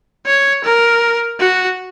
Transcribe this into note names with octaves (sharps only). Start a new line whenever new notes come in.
C#5
A#4
F#4